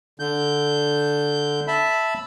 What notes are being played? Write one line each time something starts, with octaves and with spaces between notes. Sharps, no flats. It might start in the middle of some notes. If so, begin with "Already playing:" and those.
D3 G6
E5 A5 B5